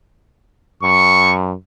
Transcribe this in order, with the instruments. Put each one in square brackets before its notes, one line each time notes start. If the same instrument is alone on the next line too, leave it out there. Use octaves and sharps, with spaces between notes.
[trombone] F#2 [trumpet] C#6